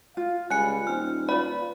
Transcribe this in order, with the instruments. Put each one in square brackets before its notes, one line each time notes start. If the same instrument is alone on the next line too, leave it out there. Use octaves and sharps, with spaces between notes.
[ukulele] F4 [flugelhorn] F5
[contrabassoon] C#2 [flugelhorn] G3 [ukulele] G#5 [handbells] F#6 C#7
[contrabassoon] D#1 [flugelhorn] C4 [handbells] F6
[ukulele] F4 B5 [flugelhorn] B4 [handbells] D5